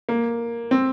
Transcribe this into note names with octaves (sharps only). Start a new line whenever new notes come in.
A#3
C4